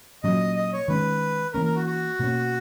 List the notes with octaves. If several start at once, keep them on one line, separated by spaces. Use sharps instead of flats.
A#2 F#3 C#4 D#5
D#5
C#5
D#3 G#3 C#4 B4
E3 A#3 C#4 A#4
A#4
F#4
F#4
B2 A#3 C#4